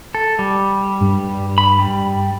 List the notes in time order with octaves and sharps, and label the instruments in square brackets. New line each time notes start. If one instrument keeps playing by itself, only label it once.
[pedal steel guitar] A4
G3
[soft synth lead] G2
[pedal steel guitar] B5
G3